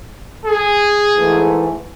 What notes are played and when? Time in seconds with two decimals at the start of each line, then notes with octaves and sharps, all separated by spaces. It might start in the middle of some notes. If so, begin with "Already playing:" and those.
0.45 G#4
1.13 G#2 E3 A3